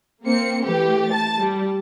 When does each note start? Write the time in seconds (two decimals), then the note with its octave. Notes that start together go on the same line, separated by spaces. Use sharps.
0.24 A#3 C4 C#7
0.64 E3 A3 G4 B4
1.08 A5 A6
1.39 G3